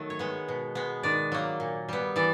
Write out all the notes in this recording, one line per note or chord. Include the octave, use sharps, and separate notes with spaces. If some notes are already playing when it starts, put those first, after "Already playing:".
Already playing: D#3 F#3 A3
C#5
G#3 B3
B2
G#3 B3
D#3 D5
F#3 A#3
A#2
G3 B3
E3 D5